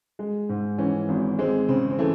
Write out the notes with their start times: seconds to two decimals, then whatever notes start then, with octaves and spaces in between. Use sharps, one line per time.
0.19 G#3
0.49 G#2
0.78 E3 C#4
1.09 G#1
1.39 G#3 C4
1.68 C#3 C4
1.91 C4
1.99 E3 A3